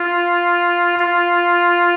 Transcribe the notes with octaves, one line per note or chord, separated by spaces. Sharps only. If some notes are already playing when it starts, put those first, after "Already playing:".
Already playing: F4
F4